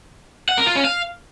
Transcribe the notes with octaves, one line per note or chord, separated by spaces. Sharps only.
F#5
A#4
F4
C#4
F5